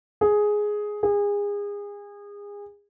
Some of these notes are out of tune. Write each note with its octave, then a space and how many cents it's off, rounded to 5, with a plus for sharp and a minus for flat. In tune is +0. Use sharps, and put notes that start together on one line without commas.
G#4 +5
G#4 -30